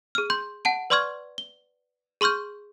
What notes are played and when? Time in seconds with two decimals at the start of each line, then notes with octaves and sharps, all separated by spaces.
0.15 G#4 F6
0.30 C6 G6
0.65 F#5 A5 D7
0.90 B4 D5 C6 C#6 F6 G#6
1.38 G7
2.21 G#4 C6 C#6 F6 G6